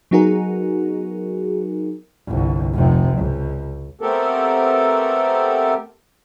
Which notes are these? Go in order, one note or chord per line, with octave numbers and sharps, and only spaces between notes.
F#3 B3 D#4 F#4 G#4 A#4
G1 C2
F1 C3
C#2
A3 B3 C4 G4 A4 A#4